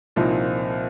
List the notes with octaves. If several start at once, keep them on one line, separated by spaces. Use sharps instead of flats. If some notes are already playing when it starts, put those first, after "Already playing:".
C2 A#2 F3 C4 D#4